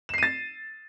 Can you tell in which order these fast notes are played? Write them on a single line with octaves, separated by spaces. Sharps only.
E7 C7 D#7 A6